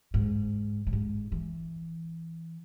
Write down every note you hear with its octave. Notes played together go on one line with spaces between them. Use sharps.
G#2
A2
G#2
E3